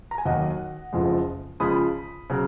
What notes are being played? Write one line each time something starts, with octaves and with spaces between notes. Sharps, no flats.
A#5
G#5
D#2 D#3 F#3 D#5 F#5
F#1 F2 F3 G#3
C#2 C#3 F3 G#3 B5 D#6
C#3 F#3